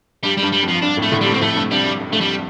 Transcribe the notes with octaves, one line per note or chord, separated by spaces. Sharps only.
G2 G3
G3
G2
G3
F2
F3
G2 D4
F2 A2
A3
A2 D3
G3
G2 C3
C4
F2 A2 A3
G2 C3
G2 C3 G3
G2
F2
G2 A3
F2 G3